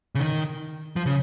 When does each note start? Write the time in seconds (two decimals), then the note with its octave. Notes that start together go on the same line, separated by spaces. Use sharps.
0.15 C#3
0.19 D#3
0.96 F3
1.06 C#3